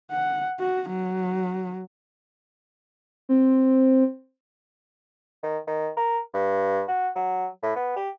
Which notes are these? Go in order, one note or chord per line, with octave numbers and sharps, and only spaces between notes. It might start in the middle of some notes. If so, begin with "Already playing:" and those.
F#5
F#4
F#3
C4
D#3
D#3
A#4
G2
F#4
F#3
A2
B3
G4